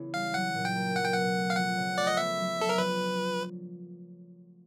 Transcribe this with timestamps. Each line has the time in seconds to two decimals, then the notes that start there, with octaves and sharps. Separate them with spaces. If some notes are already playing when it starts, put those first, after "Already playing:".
Already playing: C#3 E3 B3 E4
0.14 G3 F5
0.34 F#3 F#5
0.55 A#2
0.65 G5
0.75 A#3
0.95 F#3 F#5
1.04 G5
1.14 B2 F#5
1.36 A3
1.50 F5
1.56 F3 F#5
1.77 C#3
1.97 A3 D5
2.07 D#5
2.17 B3 E5
2.37 F#3
2.58 D4 A4
2.69 A#4
2.78 F3 B4